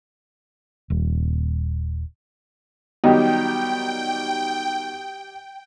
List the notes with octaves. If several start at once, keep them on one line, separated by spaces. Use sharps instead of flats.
D#1
D#3 F#3 G3 B3 G4 D#5 G5